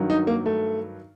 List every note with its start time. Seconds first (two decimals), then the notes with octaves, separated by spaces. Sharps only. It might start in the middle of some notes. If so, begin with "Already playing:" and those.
Already playing: G2 D#3 F#3
0.10 D#4
0.27 A#3
0.46 A3